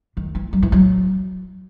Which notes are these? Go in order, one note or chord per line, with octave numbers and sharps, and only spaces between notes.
D#3
E3
F#3
E3
F#3